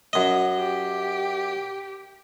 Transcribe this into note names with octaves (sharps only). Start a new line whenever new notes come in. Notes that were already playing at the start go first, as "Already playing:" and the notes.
F#2 D#5
G4